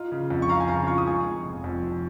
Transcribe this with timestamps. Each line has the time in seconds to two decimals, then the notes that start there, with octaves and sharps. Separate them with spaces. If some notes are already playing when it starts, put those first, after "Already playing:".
Already playing: D#4 F4
0.12 C#3
0.30 F2
0.42 C#6
0.49 F4 F5 A#5
0.60 G#5
0.68 C#3 F5 A#5
0.87 F4 C#6
0.98 D#6
1.06 G#3 G#5 C#6
1.25 F2
1.45 F1
1.64 F2
1.82 F1